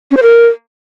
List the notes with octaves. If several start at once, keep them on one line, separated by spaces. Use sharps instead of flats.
C#4
C5
A#4